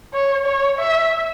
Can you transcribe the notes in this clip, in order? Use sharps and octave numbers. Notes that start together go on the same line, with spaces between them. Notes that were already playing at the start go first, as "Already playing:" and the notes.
C#5
C#5
E5